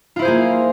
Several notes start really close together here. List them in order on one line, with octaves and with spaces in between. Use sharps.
F4 E4 C5 G#4 A#3